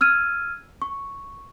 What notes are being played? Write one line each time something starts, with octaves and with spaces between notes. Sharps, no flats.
E6 F6 G#6 D#7
C#6